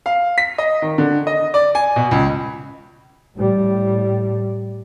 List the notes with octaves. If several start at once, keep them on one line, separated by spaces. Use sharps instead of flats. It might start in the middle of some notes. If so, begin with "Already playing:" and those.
F5
B6
D#5
D#3
D3
D#5
D5
G#5
B2
C#2
A2 G3